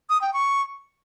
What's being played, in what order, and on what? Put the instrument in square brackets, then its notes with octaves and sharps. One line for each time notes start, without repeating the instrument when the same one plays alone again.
[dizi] D#6
G5
C#6